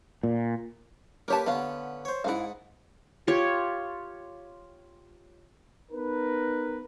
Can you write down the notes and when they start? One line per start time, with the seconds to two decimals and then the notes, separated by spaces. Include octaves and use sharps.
0.23 A#2
1.28 A#3 G4 A#4 B4 C#5 A5
1.46 D3 B3 C#4 F5
2.05 C5 C#5
2.24 G#2 E4 G#4 F5 F#5
3.27 F4 G4 C#5
5.92 B3 D#4 A#4 B4